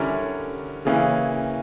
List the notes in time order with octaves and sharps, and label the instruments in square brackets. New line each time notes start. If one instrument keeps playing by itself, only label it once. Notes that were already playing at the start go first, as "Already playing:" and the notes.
Already playing: [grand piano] D3 G3 C#4 E4 A#4
C#3 E3 A#3 C#4